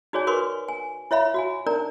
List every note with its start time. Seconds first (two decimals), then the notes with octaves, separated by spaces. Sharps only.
0.13 D#4 F#4 G#4 C#5 D5 G#5
0.27 F#4 A#4 B4 C6 C#6
0.68 G#5
1.11 E4 C#5 E5 F5 B5
1.34 F#4 F5 G#5
1.66 D4 D#4 A#4 D5 A#5